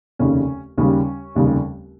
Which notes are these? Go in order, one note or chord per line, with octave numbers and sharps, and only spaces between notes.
F1 D#2 C#3 C#4
D#2 C#3 G3 C#4
F1 D#2 C#3 G3